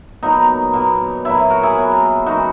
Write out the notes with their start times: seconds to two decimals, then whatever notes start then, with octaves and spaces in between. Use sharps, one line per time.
0.23 A#2 F#3 B3 D#4
0.73 A#2 F#3 B3
1.25 A#2 F#3 B3 E4
1.38 E4
1.50 F#4 A#4
1.63 E4 G#4
1.75 A#2 F#3 B3
2.26 F#2 E3 G#3 D#4 F#4